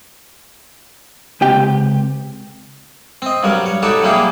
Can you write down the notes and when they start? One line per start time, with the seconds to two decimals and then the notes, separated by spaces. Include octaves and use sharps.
1.41 C#2 C3 G4 G5
3.22 C4 D#5
3.43 G2 F#3 G3 A#4
3.66 C#5
3.82 G3 D#4 F#4 G4 A4 C#5
4.02 F#3 G3 A#3 E4 G4 G#4